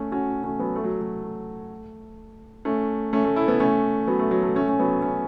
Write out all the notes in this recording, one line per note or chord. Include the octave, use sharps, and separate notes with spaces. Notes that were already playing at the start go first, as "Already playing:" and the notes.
Already playing: A3 C#4
C#4 F#4
A3 C#4
F#3 B3
A3
F#3
F#3
A3
A3 C#4
A3 C#4
A3
E4 A4
B3 E4
A3 C#4
F#3 B3
A3
F#3
A3
A3 C#4
C#4
F#3 B3
A3 C#4